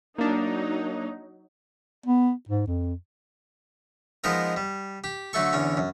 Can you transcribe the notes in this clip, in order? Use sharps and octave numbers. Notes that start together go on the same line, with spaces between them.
F#3 A#3 D4 D#4
B3
G#2
F2
F3 G#3 B3 D#4 A#4
G3
G4
D3 F#3 A3 A4 C#6
E2 D3 C#4
F#2